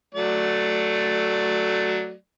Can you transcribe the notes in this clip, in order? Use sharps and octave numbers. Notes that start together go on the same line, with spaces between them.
F#3 A3 D5